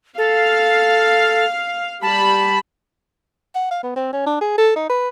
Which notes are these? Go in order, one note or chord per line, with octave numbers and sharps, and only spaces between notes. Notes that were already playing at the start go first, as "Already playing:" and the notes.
A4 F5
G3 A5 B5
F#5
F5
B3
C4
C#4
D4
G#4
A4
D#4
B4